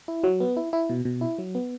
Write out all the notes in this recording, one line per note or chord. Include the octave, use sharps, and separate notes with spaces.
E4
F#3
B3
E4
E4
B2
B2
E4
F#3
B3